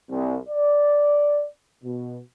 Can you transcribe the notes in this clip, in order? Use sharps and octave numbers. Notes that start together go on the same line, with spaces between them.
C2
D5
B2